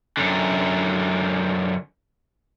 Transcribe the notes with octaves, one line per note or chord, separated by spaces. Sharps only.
F#2 D3